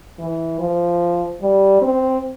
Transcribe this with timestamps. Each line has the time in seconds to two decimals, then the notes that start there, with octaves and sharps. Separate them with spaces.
0.19 E3
0.59 F3
1.41 G3
1.82 C4